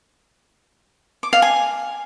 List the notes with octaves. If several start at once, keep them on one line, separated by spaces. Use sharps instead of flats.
D6
F5
G#5